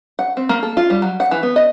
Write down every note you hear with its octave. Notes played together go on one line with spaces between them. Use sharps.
F#5
C4
A#3
A4
F4
G3
F#3
F#5
E3
B3
D#5